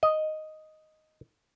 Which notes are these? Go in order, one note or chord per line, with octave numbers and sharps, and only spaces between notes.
D#5